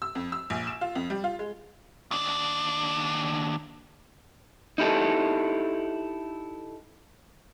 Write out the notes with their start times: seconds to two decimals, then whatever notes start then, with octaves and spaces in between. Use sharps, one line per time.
0.02 E6
0.15 F2
0.32 E6
0.50 A#1
0.67 E7
0.81 F4
0.95 F2
1.10 G3
1.24 F4
1.39 G#3
2.11 D#2 D4
4.78 D#4 E4 G4 A4